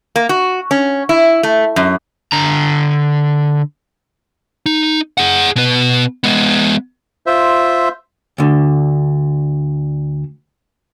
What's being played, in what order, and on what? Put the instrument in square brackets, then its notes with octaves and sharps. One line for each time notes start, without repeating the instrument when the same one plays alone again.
[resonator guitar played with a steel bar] A#3
F#4
C#4
E4
A3
F#2
[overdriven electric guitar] D3 A#5
[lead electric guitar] D#4
G#4 F#5
B2 B4
G#3 B3
[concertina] F4 C5 E5
[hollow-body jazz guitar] D2 D3